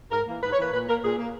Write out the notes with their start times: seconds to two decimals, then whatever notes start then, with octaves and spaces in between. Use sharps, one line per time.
0.11 G#2 A#4
0.27 E3 A#3
0.42 G#2 B4
0.53 C#5
0.58 E3 A#3 B4
0.72 A#2 B4
0.88 A#3 A#4
1.03 A#2 G#4
1.19 A#3